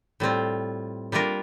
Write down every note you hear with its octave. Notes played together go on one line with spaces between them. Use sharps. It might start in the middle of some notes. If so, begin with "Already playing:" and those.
A2 G3 C4 F4
G3 A#3 D4 F4 A#4